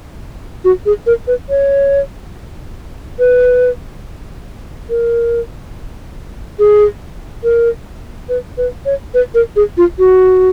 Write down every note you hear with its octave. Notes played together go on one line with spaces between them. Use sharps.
F#4
G#4
A#4
B4
C#5
B4
A#4
G#4
A#4
B4
B4
C#5
B4
A#4
G#4
F4
F#4